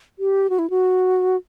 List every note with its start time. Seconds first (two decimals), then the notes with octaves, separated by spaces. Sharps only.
0.19 G4
0.50 F#4
0.59 E4
0.70 F#4